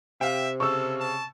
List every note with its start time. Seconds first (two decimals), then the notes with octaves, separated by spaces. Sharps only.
0.21 C3 E5 F5 G5
0.60 C#3 A4 C#6 E6
1.00 A5